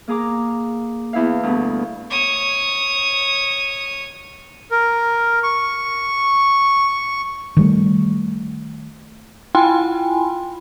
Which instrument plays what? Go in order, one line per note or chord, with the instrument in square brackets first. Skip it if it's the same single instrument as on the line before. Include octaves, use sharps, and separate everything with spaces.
[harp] A#3 G#4 A#5 D6
E2 E4 E5 F5
D2 G2 B3
[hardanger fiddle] C#5 D#6
[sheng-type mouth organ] A#4
C#6
[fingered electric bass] D#3 G3 A3
[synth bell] E4 F4 G5 G#5 B5 C6